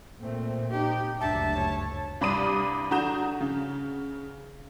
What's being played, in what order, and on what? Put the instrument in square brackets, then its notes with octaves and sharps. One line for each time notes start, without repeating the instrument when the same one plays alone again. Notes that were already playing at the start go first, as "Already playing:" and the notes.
[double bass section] A#2 C4 [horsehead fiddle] A3
[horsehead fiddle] D#4 G4
[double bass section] F#1 D2 G2 [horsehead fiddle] D4 E5 [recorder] A5
[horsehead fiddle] C#5
[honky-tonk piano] C2 G2 D5 B5 D#6 D#7
D3 F#4 A#5 D#6 G6 E7
C#3